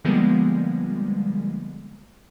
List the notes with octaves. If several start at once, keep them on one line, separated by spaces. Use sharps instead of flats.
D3 F3 G3 G#3 A#3 B3